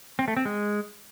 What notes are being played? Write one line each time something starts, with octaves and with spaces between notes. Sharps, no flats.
C4
A3
C4
G#3